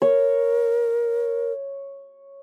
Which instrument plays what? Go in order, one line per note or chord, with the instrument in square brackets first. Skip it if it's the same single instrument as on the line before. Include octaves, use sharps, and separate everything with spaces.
[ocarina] A#4 [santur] C#5